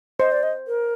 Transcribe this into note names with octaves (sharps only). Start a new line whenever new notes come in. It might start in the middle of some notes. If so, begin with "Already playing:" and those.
C5 D#5
D5
D#5
A#4